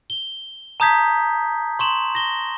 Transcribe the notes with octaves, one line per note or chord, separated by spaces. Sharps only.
G7
A5 A#5 D#6 G6 G#6 B6
C6 C#6 E7 F#7
A#6 G7